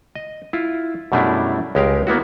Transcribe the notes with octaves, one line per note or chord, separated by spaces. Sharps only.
D#5
E4 F4
F#2 B2 G3 A3 D4 E4
C#2 G#3 G4 A#4 F5
A#3 B3 E4 F#4